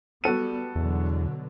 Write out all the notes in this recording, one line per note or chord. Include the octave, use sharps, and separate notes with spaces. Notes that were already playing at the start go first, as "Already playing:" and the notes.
G3 B3 F#4 A4 D#7
E2 B2 D3 F#3